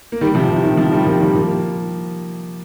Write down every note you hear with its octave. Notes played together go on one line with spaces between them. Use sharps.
A#3
D#3 G3
C3 F3
C3
D#3
C3 F3
D#3 G3
F3 A#3
D#3 G3
F3 A#3